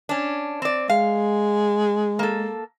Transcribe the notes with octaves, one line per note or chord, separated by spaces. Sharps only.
C#4 D4
C4 D5
G#3 F5
A#3 A4